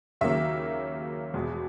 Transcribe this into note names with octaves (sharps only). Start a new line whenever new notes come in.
D#2 C#3 F#3 A#3 E5
E2 B2 G#3